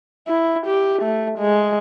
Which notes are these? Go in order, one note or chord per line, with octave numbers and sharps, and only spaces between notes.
E4
G4
A3
G#3